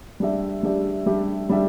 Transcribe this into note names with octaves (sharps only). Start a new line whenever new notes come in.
G3 D4 G4 E5
G3 D4 G4 E5
G3 D4 G4 E5
G3 D4 G4 E5